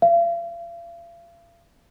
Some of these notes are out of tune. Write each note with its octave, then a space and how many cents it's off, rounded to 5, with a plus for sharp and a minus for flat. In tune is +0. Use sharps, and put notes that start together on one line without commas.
F5 -40